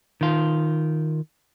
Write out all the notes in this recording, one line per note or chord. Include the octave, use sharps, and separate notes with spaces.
D#3 F4